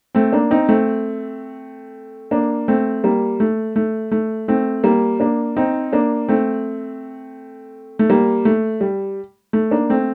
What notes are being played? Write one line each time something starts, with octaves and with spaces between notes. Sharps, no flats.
A3 C4
A#3 D4
C4 D#4
A3 C4
A#3 D4
A3 C4
G3 A#3
A3
A3
A3
A3 C4
G3 A#3
A#3 D4
C4 D#4
A#3 D4
A3 C4
A3
G3 A#3
A3
G3
A3
A#3 D4
A3 C4